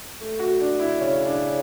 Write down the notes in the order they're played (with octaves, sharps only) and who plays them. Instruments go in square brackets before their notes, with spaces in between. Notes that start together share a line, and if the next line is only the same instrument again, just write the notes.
[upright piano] A3
F#4
D4
E4
[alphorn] C#3 [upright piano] C#4
[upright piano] D4